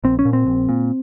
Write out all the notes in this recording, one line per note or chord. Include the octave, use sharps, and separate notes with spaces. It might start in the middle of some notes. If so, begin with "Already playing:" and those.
A#1 C4
C#4
A#2
C4
A#1
A#2